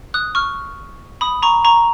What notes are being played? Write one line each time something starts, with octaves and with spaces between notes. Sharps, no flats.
D#6 F#6
C#6 F6
B5 D#6
A#5 C#6
A#5 C#6